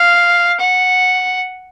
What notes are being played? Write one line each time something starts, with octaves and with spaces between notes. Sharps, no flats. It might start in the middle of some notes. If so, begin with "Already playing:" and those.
Already playing: F5
F#5